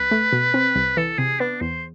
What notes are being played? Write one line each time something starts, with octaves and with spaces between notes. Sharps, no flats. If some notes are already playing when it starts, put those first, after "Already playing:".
Already playing: C2 B4
A3
B2
C4
C2
E3 A4
C3 G#4
B3 D4
E2 C5